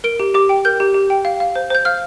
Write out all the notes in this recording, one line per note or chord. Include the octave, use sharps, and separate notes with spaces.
A#4 D7
G4
G4 D6
G5
A#4 G6
G4
G4
G5
F5
F5
C5
C5 G6
F5 F6